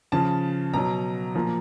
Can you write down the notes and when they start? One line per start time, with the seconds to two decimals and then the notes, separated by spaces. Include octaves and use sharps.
0.12 C#3 F3 A5
0.74 B2 F#3 A#5
1.35 A#2 F3